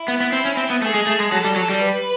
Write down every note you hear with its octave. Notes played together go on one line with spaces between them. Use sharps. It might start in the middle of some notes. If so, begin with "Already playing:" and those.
Already playing: E4
B3
B3
C4
C#4
C4
B3
A3 G#4
G#3
A3
G#3
F#3 A4
G3
F#3
G3
B4